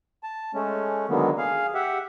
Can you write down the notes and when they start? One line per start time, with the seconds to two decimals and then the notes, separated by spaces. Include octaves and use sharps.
0.23 A5
0.54 G#3 A3 C#4
1.09 D3 D#3 F#3 G#3 A#3 B3
1.38 G#4 F5
1.75 G4 E5 F#5